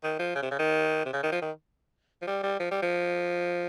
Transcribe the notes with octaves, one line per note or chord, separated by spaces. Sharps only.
D#3
F3
C#3
C3
C#3
D#3
C3
C#3
D#3
F3
D#3
F3
G3
G3
F3
G3
F3